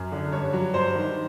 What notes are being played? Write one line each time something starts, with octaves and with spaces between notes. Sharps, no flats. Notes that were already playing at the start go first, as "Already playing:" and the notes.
Already playing: F#2
D3
G2 C#5
F#3
G2 C5
D#3